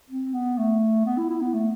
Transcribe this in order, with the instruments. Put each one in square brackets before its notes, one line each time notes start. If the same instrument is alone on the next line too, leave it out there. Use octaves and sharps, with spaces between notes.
[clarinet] C4
B3
A3
B3
E4
E4
B3
A3